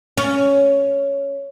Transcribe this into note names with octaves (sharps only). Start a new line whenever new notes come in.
C#4